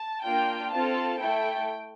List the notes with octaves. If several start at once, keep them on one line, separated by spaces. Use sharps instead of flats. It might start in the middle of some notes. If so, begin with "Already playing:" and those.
Already playing: A5
A#3 D4 F4 G5
C4 F4 A4 A5
A3 E4 A4 G5